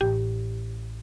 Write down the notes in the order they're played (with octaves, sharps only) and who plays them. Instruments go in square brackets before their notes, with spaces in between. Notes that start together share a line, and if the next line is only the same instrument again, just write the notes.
[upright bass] A1 [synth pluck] G4